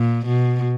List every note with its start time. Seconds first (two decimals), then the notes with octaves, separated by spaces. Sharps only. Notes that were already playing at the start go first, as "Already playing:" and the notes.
Already playing: A#2
0.26 B2